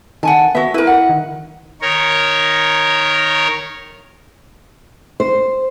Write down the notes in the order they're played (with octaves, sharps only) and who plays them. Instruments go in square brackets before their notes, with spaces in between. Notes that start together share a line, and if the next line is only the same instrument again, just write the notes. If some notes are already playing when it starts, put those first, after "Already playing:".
[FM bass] D#3 [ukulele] F#5 G#5 A5
[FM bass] B3 [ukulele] F#4 E5
[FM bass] E4 [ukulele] A#4 B4
[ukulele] F#5
[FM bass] D#3
[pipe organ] D#3 A#4 C#5
[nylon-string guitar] C5